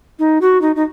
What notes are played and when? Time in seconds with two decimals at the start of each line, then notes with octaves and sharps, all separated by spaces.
0.19 D#4
0.41 F#4
0.62 D#4
0.76 D#4